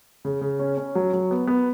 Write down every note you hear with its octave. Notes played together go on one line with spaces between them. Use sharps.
C#3
C#3
C#4
C#4
F#3
F#3
B3
B3